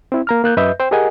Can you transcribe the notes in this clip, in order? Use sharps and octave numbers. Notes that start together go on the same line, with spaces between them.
C4 E4
A#3 A#5 F6
A#3 F#6 G6
F#2 B4 D#5 E5 G6
C5 G5
G4 G#4 A#4 D#5 F#5 G#5